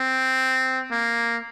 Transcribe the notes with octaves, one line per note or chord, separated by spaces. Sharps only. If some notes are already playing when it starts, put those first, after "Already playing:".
Already playing: C4
A#3